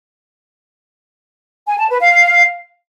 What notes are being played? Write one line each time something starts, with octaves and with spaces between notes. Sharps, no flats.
G#5
A5
B4
F5